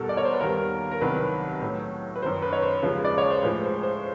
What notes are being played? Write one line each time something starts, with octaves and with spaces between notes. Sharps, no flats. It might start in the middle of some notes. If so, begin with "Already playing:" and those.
Already playing: E2 B2 G3 A4 A#4
D5
C#5
C5
B4
D#2 D#3 G3 A#4
A#4
C2 C3 D#3 F#3 B4
A2 F#3
B4
F#2 D#3 F#3 C5
B4
C#5
C5
D#2 C#3 F3 G#3 B4
D5
C#5
C5
A2 F3 G#3 B4
C5
C5